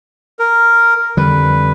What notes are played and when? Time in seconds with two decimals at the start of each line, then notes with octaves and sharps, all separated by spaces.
0.39 A#4
1.17 F2 D3 G3 B4